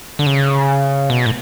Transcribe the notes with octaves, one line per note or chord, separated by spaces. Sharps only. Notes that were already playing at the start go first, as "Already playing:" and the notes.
D3
C#3
B2
A2